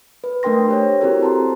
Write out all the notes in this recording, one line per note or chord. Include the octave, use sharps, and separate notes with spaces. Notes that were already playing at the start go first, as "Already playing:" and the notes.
B4
A3 D4 A#4 G5 C6 A#6
G4 C5 C#5
C4 E4 F#4 G4 A4 A#4
C5 A5 A#5 C6